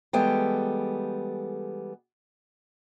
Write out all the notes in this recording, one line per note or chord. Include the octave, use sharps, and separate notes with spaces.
E3 G3 G#3 B3 A4 G5